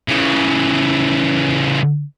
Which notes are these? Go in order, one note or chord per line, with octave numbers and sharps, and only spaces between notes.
C#3 E3